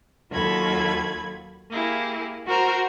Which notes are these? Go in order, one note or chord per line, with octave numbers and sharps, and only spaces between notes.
D#2 F#3 F4 A4 B5 G#6
A#3 E4 G4 G#4
F#4 A#4 C5 A#5